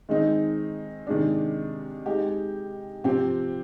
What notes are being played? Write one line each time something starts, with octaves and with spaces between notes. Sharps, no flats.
D#3 G#3 C4 D#4
C3 D#3 G#3 D4
G#3 D#4 G4
C3 F3 C4 G4